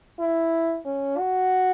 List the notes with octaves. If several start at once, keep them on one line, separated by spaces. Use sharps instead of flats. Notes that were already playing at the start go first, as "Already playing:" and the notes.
E4
C#4
F#4